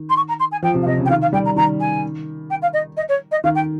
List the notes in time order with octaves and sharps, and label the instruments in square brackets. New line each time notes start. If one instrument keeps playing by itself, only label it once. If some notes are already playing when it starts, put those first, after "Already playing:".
Already playing: [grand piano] D#3
[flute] C6
C#6
A#5
C6
G#5
[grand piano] F3 [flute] G5
[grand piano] C3
[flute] F5
[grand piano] C3 [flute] D#5
[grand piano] C#3
[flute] G5
[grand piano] D#3 [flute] F5
[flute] F5
[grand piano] G3 [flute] G5
[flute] A#5
[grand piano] D#3 [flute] A#5
[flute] G#5
G5
F5
D#5
D#5
C#5
D#5
[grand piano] D#3 [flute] F5
[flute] G5